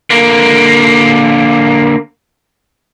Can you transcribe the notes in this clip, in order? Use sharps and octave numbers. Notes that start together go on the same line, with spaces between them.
D3 A#3